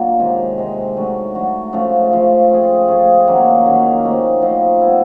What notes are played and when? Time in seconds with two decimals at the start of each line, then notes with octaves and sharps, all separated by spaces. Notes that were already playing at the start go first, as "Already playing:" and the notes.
Already playing: A#2 F#3 A#3 D4
0.19 C3 D#3 G#3
0.58 C3 D#3 G#3
0.97 F#3 A3 D4 F#4
1.35 F#3 A3 D4 F#4
1.73 C#3 F3 A3
2.12 C#3 F3 A3
2.51 A3 C4 F4 G#4
2.88 A3 C4 F4 G#4
3.27 D#3 F#3 A#3 C#4
3.66 D#3 F#3 A#3 C#4
4.03 F3 A3 C4 D#4
4.42 F3 A3 C4 D#4
4.81 G3 B3 E4